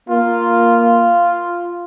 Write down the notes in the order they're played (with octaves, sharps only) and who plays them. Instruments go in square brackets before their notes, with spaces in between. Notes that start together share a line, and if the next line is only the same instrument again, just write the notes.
[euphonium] A#3 [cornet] F4